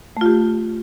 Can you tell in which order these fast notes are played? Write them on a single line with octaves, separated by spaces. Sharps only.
A3 F4 G4